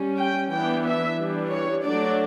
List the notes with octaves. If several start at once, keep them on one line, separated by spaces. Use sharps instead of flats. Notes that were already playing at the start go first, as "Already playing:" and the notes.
Already playing: G3 C#4
G5
E3 B3 D4 G5
E5
E3 G3 D4
C#5
F#3 A3 D4 D5